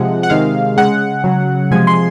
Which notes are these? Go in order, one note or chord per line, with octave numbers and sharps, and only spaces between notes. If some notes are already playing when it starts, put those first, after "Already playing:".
Already playing: C3 F3 G#3 F#5
F#5
C3 D#3 G#3 F5
C#3 G#3 F#5
C#3 F#3
C3 F3 G#3 G#5
C6